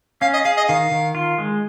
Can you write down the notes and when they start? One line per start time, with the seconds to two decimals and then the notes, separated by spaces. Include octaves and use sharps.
0.21 C#4 F5
0.34 D#5
0.45 G#4 F5
0.57 D#5
0.69 D#3 F5
0.91 D#3
1.15 F4
1.38 G#3